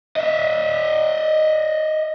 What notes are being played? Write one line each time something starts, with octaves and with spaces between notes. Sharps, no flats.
D#5 E5